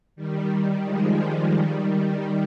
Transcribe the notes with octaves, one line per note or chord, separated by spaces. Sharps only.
D#3 G3
F3 G#3
D#3 G3